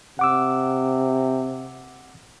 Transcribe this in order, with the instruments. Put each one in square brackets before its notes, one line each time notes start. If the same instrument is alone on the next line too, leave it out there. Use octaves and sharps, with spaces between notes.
[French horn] C3 [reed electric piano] F#5 D6 E6